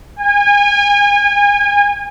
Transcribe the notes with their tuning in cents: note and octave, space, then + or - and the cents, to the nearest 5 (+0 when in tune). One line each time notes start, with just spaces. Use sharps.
G#5 -35